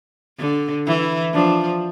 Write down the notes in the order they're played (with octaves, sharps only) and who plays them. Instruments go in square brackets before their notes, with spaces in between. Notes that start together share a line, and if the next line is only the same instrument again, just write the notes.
[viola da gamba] D3
[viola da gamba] E3 [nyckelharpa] E4
[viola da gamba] F3 [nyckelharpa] D4